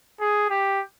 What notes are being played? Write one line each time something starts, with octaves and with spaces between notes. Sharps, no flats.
G#4
G4